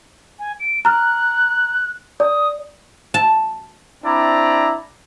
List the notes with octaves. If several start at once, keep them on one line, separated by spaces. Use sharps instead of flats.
G#5
D7
A#5 F6 F#6
D5 D#6
A5
C4 D4 E4 D5 A#5